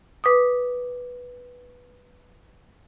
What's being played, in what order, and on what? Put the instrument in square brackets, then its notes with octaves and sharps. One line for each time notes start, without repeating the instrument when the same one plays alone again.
[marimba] B4 D6 D#6